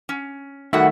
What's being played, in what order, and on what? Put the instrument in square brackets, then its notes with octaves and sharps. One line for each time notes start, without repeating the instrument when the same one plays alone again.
[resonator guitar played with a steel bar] C#4
[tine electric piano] D#3 A3 E5 [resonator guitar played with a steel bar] G3 F#4 F#5